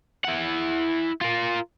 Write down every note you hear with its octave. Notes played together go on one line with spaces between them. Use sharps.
E4 F#5
F4 A#4